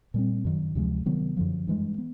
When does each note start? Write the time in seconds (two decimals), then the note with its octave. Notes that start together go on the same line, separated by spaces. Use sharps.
0.14 A#2 G3 C4
0.45 F#2 D#3 F#3
0.75 D2 C3 F3 G#3
1.06 C3 D#3 F#3 B3
1.37 F#2 D3 F3
1.67 G2 E3 G#3
1.98 B3